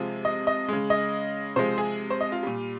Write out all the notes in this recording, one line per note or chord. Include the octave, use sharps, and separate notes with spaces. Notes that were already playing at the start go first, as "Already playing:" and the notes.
Already playing: C3 F3 G#3
D#5
D#5
C#3 G#3
D#5
C3 F3 G#3 C5
G#4
C5
D#5
F4
A#2 G3